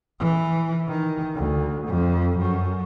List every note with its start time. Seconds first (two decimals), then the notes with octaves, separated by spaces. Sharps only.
0.19 E3
0.87 D#3
1.34 D2
1.87 F2
2.38 F#2